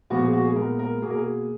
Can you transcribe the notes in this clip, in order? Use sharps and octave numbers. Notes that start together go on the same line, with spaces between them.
A#2 F3 G#3 B3 F#4
G#4
F#4
G#4
A#2 G#3 B3 A#4
A#4
B2 A#3 G#4
A#4
G#4